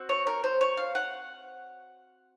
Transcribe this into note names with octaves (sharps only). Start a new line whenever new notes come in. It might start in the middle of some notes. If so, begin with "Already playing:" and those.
Already playing: C4 F#4
C#5
A#4
C5
C#5
F5
F#5